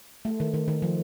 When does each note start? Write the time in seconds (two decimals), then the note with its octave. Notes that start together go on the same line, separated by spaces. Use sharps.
0.25 A3
0.40 D#3
0.54 D#3
0.68 D#3
0.82 F3